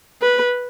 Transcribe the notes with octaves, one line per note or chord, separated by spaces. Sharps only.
B4